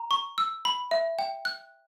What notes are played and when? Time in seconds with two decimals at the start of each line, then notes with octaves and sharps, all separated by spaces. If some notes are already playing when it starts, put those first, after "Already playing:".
Already playing: A#5
0.11 C#6
0.38 E6
0.65 B5
0.91 E5
1.19 G5
1.45 F#6